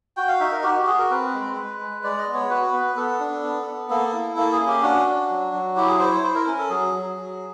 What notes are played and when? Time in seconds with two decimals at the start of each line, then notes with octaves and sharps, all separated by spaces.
0.17 F#4 G5
0.28 F5
0.40 D#4 E5
0.52 A#4
0.63 F#4 G4
0.75 G4
0.87 F#4 G#4
0.99 A#4
1.10 C4 B4
1.33 G#3
1.56 G#3
1.80 G#3
2.04 G#3 D5
2.18 D#5
2.27 B3
2.34 C#5
2.50 F#4 B4
2.73 B3
2.96 B3 A4
3.20 D4
3.43 B3
3.67 B3
3.90 A#3 A4
4.13 E4
4.36 A#3 A4
4.52 G#4
4.59 C#4
4.67 G4
4.83 D4 F#4
5.06 D4
5.30 F#3
5.53 F#3
5.76 E4 G4
5.88 G#4
5.99 E4 C5
6.11 C#5
6.23 E4 C5
6.35 A#4
6.46 C#4 A#4
6.58 A4
6.70 F#3 G#4
6.93 F#3
7.17 F#3